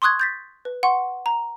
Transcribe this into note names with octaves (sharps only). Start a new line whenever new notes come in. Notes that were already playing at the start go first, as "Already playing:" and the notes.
C6 C#6 D#6 F#6 G#6
G6 A6 B6
B4
F#5 C6 C#6
A#5